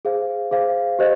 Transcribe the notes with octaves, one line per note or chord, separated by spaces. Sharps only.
G#4 C5 F5
G#4 C5 F5
G4 C5 D#5